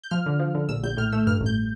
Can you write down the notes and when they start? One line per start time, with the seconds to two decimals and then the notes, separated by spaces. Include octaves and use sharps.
0.04 G6
0.11 F3 F6
0.26 D3
0.39 F3
0.55 D3
0.69 A#1 E6
0.83 A#1 G6
0.97 A2 F6
1.12 A3 E6
1.27 G2 F6
1.40 A1
1.46 G6